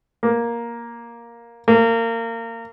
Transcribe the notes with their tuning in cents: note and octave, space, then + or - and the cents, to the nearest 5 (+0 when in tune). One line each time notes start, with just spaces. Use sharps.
A#3 +10
A#3 -25